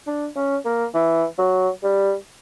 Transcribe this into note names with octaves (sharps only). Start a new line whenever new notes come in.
D4
C#4
A#3
E3
F#3
G3